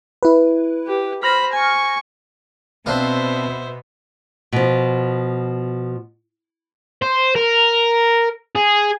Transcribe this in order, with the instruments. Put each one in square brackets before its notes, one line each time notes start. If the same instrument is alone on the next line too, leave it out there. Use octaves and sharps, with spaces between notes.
[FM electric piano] E4 B4
[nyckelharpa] G4
[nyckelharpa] C5 B5 [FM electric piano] F6 A#6
[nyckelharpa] G#5 C#6
[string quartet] B2 B3 [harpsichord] C4 D4 F4 [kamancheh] C5 E5
[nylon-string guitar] B2 F3
[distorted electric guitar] C5
A#4
G#4